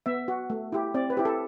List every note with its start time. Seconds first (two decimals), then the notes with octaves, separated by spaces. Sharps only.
0.06 B3 E5
0.28 F#4
0.50 A3
0.72 E4 G4
0.94 C4 D5
1.10 B4
1.17 E4 G4
1.25 A4